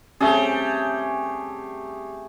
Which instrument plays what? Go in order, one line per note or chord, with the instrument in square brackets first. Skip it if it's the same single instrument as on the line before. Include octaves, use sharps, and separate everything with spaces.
[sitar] G3 [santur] A3 G#4 [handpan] C4 C#4 G4